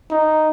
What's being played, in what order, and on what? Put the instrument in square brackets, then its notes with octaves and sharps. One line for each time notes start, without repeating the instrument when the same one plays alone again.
[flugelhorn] D#4